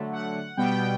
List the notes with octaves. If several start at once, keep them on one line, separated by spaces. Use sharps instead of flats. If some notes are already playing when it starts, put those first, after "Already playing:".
Already playing: D3 F#3 A3
F#5
B2 G3 B3 G5